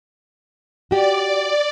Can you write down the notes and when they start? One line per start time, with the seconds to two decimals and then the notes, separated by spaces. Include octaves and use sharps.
0.91 F#4 G4 D5